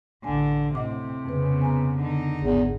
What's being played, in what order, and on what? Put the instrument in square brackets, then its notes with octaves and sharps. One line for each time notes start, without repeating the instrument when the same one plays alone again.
[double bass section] A1 [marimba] D2 G#5 [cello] D3
[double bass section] A2 C4 [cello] C3 [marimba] D#5 F#5 D6
[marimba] F2 B4 [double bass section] C#3 B3
[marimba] G#5 A#5
[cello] D3 D#4
[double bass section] G#1 [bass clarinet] E2